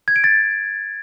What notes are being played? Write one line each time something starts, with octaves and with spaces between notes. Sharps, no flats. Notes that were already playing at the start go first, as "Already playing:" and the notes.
G#6
D7
A6